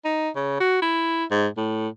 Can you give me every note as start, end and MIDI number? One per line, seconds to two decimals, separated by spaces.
0.05 0.29 63
0.36 0.55 49
0.60 0.79 66
0.82 1.25 64
1.31 1.47 44
1.57 1.88 45